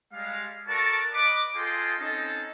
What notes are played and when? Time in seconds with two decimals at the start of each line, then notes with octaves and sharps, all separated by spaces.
0.13 G3 G#3 F5
0.68 F#4 A4 A#4 D5 A5 C#6
1.13 B4 D#5 B5 D6
1.55 F4 G#4 A4 D#5 G5 C6
1.99 C4 C#4 D#4 A4 D#5